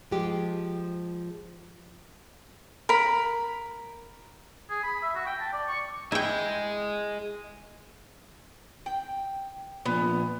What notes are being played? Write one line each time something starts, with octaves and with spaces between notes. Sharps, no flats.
F3 G#3 G4
A#4 B5
G#4
B5
E5
F#4
G5
A5
D5
C#6
E4 G#4 D#5 G5
G5
A#2 F3 B3